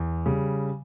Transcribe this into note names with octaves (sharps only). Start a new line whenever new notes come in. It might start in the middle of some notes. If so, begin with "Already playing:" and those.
Already playing: E2
C#3 G3